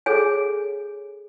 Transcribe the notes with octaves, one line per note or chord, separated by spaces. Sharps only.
G#4 A4 C#5 G#5